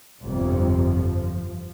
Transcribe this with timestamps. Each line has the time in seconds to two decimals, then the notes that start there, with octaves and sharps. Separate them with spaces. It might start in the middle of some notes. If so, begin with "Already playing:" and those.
0.24 G1 F2 C3 G3
0.67 F3